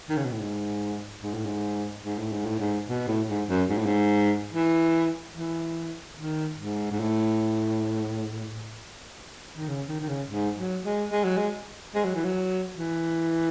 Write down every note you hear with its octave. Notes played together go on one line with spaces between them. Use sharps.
D#3
C#3
B2
A2
G#2
G#2
A2
G#2
G#2
A2
G#2
A2
G#2
B2
A2
G#2
F#2
G#2
A2
G#2
E3
E3
D#3
G#2
G#2
A2
D#3
C#3
D#3
D#3
C#3
G#2
F#3
G#3
G#3
F#3
G#3
G#3
F#3
E3
F#3
E3